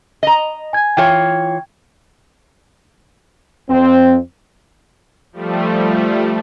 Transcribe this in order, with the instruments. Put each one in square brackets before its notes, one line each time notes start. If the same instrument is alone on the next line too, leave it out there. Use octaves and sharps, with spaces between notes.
[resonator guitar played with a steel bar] D#5 A#5
[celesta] G#5 G#6
[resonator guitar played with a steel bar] E3 F4 C#5 [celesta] G5 G#6
[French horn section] F2 C4
[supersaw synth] F3 G3 A3